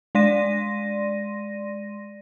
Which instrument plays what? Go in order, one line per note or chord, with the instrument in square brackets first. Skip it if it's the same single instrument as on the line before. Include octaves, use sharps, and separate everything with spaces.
[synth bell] G#3 D5 C6 A#6 D#7